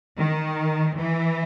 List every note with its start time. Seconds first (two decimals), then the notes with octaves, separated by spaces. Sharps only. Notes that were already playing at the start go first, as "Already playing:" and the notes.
0.18 D#3
0.97 E3